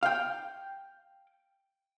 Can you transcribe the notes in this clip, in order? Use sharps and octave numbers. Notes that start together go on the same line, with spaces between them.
F5 G5